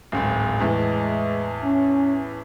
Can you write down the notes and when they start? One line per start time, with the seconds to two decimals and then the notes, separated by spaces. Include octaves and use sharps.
0.12 D1 G#1
0.60 E2 A2 E3 G#3
1.64 C#4